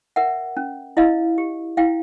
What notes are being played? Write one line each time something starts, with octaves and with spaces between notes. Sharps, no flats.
A#4 E5 F#5
C#4
E4 D#5 F5
G4
E4 F5 G5